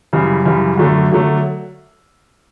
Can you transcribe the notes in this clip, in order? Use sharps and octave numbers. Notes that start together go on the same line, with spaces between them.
F#2 C#3 E3 G3
F#2 C#3 E3 G3
F#2 D3 F#3 A3
D3 F#3 A3